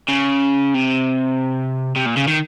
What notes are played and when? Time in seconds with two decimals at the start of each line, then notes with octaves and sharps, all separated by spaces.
0.09 C#3
0.75 C3
1.96 C3
2.06 A#2
2.17 C#3
2.28 D#3